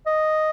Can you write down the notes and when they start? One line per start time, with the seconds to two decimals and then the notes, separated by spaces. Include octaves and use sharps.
0.06 D#5